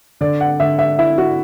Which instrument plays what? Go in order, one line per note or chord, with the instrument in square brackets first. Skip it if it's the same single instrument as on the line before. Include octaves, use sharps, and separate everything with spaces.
[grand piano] D3 [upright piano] D5
[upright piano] F#5
[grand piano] D3 [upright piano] E5
[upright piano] E5
[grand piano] E4 [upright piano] E5
[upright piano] F#4